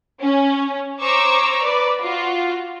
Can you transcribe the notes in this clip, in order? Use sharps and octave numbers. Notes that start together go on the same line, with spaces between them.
C#4
C5 C#5 A#5 C#6 D6 E6
B4 D5
F4 F#4